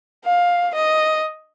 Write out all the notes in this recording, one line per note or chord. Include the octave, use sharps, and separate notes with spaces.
F5
D#5